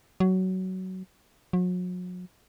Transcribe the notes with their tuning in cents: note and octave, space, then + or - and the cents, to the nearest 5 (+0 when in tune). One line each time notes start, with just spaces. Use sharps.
F#3 +15
F#3 -40